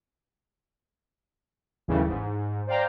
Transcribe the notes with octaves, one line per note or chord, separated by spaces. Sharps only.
G1 D#2 A2 C#3 E3 G3
G#2
C5 D5 F5 G5 A#5